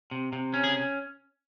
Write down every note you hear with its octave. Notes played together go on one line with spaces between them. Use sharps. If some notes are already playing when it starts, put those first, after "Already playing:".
C3
C3
C#4
G#4